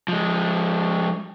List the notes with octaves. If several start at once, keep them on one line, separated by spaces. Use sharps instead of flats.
F3 G#3